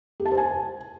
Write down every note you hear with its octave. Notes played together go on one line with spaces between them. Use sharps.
G4
A5
C5
G#5